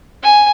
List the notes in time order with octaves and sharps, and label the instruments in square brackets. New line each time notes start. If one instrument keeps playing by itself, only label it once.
[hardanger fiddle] G#5